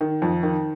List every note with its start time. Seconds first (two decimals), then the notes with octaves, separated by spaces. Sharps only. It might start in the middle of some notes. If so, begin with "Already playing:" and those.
0.01 D#3
0.22 F2
0.43 D#3